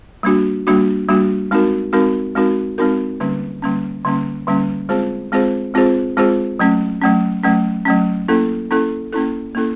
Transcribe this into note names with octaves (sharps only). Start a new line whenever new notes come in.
G3 A#3 D4 F#4
G3 A#3 D4 F#4
G3 A#3 D4 F#4
G#3 C4 D#4 F#4 A#4
G#3 C4 D#4 F#4 A#4
G#3 C4 D#4 F#4 A#4
G#3 C4 D#4 F#4 A#4
D3 G3 A#3 C#4
D3 G3 A#3 C#4
D3 G3 A#3 C#4
D3 G3 A#3 C#4
G#3 C4 F4 G#4 C5
G#3 C4 F4 G#4 C5
G#3 C4 F4 G#4 C5
G#3 C4 F4 G#4 C5
F#3 A3 C#4
F#3 A3 C#4
F#3 A3 C#4
F#3 A3 C#4
A#3 C#4 E4 A4
A#3 C#4 E4 A4
A#3 C#4 E4 A4
A#3 C#4 E4 A4